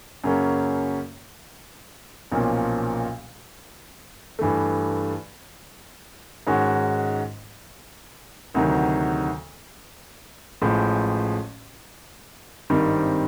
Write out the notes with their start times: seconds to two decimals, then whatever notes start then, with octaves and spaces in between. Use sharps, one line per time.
0.24 F#2 C#3 F#3 A#3 C#4
2.32 B1 A#2 F3 A#3 C#4
4.39 G2 E3 A3
6.47 G#2 D#3 G#3 C#4 F#4
8.54 D2 C3 D#3 F#3
10.62 A1 A2 F3 G#3
12.70 G#1 G2 D#3 G3 C4